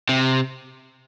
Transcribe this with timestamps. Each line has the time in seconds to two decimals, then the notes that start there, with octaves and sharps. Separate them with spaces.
0.09 C3